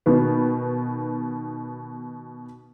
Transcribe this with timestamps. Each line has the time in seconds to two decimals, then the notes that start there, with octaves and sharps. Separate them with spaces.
0.06 B2 D#3 B3